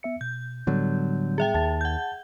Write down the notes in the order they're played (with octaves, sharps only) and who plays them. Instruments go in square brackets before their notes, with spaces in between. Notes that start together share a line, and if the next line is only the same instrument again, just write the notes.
[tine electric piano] B3 E5 C#7
[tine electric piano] B2 [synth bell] G6
[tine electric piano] A2 G3 B3 [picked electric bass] D3 F#3
[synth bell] G#4 E5 G5
[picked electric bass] D#2 [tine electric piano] A5 A6
[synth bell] F#5 G6